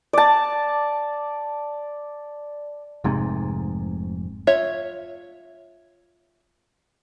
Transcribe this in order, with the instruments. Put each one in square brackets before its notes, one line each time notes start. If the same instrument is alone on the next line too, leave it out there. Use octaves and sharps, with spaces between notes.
[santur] D5 A5
[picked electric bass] F1 G#2 C3
[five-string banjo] F4 C#5 E5